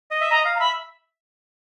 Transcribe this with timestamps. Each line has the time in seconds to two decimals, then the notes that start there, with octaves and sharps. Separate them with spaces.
0.11 D#5
0.21 E5
0.30 D#5 A#5
0.45 F5
0.55 A#5
0.60 E5 B5